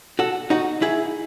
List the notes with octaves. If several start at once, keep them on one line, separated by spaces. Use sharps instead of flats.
F#4 A4
D#4 F#4
E4 G#4